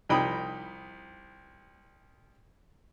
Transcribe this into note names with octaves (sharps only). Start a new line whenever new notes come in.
C2 F3 D#4 G5 B5 D#6